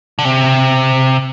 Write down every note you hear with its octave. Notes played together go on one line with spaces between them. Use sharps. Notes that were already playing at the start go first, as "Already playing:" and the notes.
D3
C3